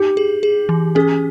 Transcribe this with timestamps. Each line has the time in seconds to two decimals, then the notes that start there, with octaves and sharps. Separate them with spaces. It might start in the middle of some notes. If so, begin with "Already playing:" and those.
Already playing: D#4 G4
0.17 G#4
0.43 G#4
0.69 E3
0.95 C#4 G#4